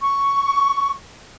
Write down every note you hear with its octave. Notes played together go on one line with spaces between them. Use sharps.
C#6